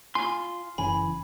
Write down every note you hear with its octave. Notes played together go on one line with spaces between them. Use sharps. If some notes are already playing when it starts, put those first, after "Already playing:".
F4 G#5 C6
F#1 E3 C#4 G#5 B5